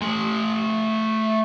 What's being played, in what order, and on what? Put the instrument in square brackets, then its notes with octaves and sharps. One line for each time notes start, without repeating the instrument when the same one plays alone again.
[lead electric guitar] A3 G#5